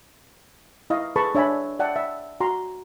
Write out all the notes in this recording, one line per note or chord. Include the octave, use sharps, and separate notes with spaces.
E4 D#5 F5 C#6
G#4 A4 B4 A5 B5 C#6
D4 C#5 E5 G#5 B5
D5 E5 F#5 G5 A5
E5
F#4 A#5 C6